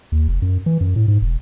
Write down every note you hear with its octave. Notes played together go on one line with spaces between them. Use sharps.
D#2
F1
F#2
E3
F#2
A2
G#2
E1